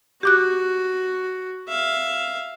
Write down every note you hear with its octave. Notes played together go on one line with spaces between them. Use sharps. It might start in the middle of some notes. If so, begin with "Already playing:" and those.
F#4 G4 D6 F#6
E5 F5